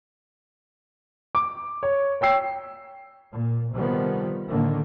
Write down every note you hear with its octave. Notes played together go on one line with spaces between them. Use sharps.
D6
C#5
C#5 G5 E6 C7
A#2
C3 D#3 F3 G3 B3
A2 D3 D#3 A#3